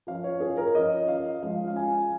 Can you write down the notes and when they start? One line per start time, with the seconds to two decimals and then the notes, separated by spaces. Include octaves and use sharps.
0.07 F3 C#4 F5
0.24 C#5
0.41 G#4
0.57 A#4
0.75 F3 C#4 D#5
1.08 F5
1.42 F3 G#3 C#4 F5
1.68 F5
1.76 G#5